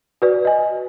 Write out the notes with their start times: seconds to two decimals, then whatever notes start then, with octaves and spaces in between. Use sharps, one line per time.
0.22 F#4 B4 D5
0.45 D#5 G#5